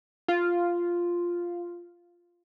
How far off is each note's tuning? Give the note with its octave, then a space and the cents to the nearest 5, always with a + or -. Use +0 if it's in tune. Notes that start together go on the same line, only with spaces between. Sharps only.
F4 -5